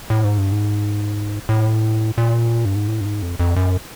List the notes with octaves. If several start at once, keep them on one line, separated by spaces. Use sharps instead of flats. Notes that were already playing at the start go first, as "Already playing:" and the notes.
A2
G#2
G2
G#2
A2
A#2
G2
G#2
A2
G2
G#2
F2
F2
F#2